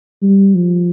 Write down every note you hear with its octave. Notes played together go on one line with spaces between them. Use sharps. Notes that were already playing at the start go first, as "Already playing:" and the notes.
G3
F3